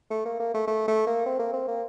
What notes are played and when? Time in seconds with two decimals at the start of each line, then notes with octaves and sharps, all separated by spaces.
0.10 A3
0.25 A#3
0.40 A#3
0.54 A3
0.68 A3
0.88 A3
1.07 A#3
1.26 C4
1.39 A#3
1.53 C4
1.68 A#3